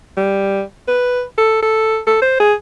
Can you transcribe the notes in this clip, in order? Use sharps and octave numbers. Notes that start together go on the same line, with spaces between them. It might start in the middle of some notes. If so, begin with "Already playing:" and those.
G3
B4
A4
A4
A4
C5
G#4